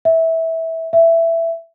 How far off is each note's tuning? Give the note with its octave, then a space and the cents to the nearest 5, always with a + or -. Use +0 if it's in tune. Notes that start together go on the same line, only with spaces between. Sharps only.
E5 -15
E5 +10